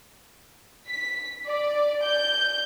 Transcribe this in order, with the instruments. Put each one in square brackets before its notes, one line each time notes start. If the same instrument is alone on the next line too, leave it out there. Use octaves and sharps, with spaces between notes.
[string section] B6
D5
G6